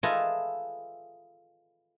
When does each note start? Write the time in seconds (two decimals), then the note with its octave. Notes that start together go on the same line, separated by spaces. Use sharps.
0.03 F4 G#4 A4 B4 D#5 E5